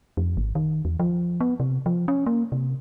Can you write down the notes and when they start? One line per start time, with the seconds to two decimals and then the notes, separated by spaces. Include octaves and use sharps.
0.17 F2
0.37 G#1
0.55 D#3
0.85 E2
1.00 F3
1.40 B3
1.60 C3
1.86 F3
2.08 C#4
2.26 A#3
2.52 C3